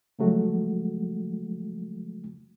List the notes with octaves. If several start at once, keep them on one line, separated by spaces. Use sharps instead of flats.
C#3 F3 F#3 G#3 A3 F#4